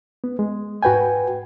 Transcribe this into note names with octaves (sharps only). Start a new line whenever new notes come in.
B3
G#3
G#2 F#4 B4 G5 G#5